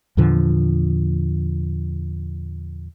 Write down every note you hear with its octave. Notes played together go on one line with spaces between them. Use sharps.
E2 A#2 D3 F3